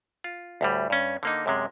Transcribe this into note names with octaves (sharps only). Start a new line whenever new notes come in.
F4
D2 A2 G3
G2 C#4
D3 A#3 D#4
F#2 C3 G#3